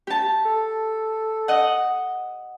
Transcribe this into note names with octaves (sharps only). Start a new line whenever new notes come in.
G4 A5
A4
D#5 F#5